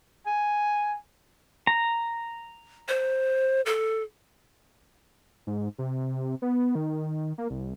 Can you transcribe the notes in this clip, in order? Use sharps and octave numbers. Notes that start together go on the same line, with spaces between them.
G#5
A#5
C5
A4
G#2
C3
B3
D#3
A#3
C2